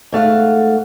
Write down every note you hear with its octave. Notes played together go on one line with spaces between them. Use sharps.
G#2 A3 F5 F#5